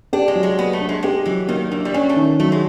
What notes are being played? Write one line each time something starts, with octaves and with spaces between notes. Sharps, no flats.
D4 G4
G#3
F#3
G#3
A#3 B3
A3
D4
G#3
G#3 G4
E3 F#3
D#3 A#3
E3 D4
G3
F#3 C#4
A3
D#3
F#3 A3
G#3